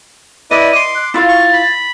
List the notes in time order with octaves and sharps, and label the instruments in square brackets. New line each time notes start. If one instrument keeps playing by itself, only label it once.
[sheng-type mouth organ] E4 B4 D5 [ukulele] D#5 [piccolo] D#7
[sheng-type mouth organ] C6 D6
[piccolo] F#6
[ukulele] E4 F4 F5 [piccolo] A6
[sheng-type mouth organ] C#6
B5